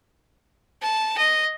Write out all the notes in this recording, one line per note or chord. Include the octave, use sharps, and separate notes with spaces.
A5
D#5